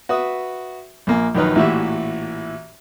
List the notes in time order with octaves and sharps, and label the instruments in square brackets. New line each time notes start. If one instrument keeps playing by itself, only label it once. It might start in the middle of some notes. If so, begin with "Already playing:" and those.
[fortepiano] F#4 B4 E5 D#6
A#1 A#3 G#5
A#1 D#3 F#3 D#4 B4 F6
A1 A#2 E3 F#4 G4 E5